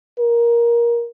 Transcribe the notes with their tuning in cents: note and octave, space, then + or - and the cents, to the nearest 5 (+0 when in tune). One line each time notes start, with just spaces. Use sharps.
A#4 +15